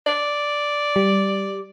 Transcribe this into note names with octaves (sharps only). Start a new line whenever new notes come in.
D5
G3